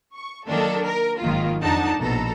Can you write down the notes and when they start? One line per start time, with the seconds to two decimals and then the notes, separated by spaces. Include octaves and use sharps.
0.16 C#6
0.48 D#3 F#3 A#3 D4 A4
0.85 A#4
1.21 G#1 D#3 F#3 A#3 F4
1.61 F2 D4 D#4 F#5 A5
2.00 A#1 B2 A4 A#5